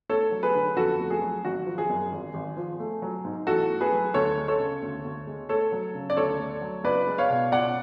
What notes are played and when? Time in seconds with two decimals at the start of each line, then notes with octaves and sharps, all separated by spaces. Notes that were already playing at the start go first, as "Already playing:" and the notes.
0.09 A3 A4 C#5
0.32 F#3
0.43 G#4 B4
0.54 D3
0.77 F2 F#4 A4
1.00 A3
1.10 G#4
1.22 F#3
1.45 G#1 F#4
1.66 F3
1.78 G#4
1.90 F#2
2.12 G#1
2.34 G#1
2.57 F3
2.80 A3
3.02 F#3
3.25 G#2
3.47 A1 F#4 A4
3.70 A3
3.81 G#4 B4
3.92 F#3
4.14 D2 A4 C#5
4.37 G#3
4.48 A4 C#5
4.59 C#3
4.82 D2
5.05 D2
5.27 G#3
5.49 A3 A4 C#5
5.72 F#3
5.94 C#3
6.10 D5
6.17 D2 A4 C#5
6.39 A3
6.62 F#3
6.84 C#2 B4 D5
7.07 G#3
7.18 C#5 F5
7.29 B2
7.52 C#2 D5 F#5